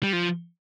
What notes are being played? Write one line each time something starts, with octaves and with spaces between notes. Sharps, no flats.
G3
F3